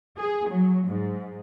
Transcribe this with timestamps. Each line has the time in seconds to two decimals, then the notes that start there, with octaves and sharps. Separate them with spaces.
0.19 G#4
0.50 F#3
0.88 G#2